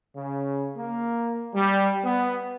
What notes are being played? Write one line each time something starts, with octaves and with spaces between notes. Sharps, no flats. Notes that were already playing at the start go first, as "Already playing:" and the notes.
C#3
A#3
G3
B3